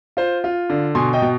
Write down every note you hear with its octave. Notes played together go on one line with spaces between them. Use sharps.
F4 C5
F4
D3
B2 G#5 C6
D#5 G5
B2